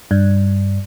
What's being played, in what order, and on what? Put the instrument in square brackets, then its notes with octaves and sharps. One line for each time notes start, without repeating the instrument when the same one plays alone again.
[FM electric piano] G2